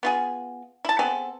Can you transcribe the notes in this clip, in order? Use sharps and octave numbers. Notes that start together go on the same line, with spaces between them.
B3 F4 G#4
E4 A5
B3 C4 G#4 A4